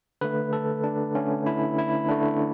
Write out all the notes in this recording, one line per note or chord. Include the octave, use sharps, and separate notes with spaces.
D3 A3 B4
A4
D4
D3 A3 C#4
E4
E4
D3 A3 D4